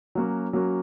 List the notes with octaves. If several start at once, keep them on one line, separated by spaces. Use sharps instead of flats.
F#3 A#3 C#4 F#4
F#3 A#3 C#4 F#4